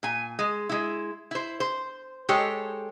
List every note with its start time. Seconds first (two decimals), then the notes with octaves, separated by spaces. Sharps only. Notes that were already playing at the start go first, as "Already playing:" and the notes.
0.03 A#2 G#5
0.39 G#3
0.69 G#3 E4
1.31 E4 C5
1.60 C5
2.29 G#3 G4 A4 C5 C#5